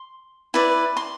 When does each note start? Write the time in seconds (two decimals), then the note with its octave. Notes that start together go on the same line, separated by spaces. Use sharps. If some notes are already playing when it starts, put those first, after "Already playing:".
Already playing: C6
0.54 E4 B4 D5
0.97 C6